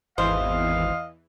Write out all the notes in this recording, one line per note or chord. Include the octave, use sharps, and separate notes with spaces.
G#1 E2 E3 C5 D#5 F5